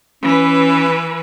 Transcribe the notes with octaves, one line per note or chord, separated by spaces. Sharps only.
E3 C#4 B4